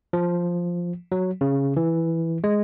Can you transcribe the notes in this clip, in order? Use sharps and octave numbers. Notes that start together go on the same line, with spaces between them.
F3
F#3
C#3
E3
G#3